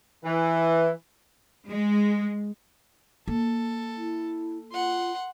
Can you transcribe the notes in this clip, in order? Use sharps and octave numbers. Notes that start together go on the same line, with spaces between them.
E3
G#3
A#3 A4
E4
F4 F#5 C6